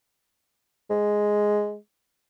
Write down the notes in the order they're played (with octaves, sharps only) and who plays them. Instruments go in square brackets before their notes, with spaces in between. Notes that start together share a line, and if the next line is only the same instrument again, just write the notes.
[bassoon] G#3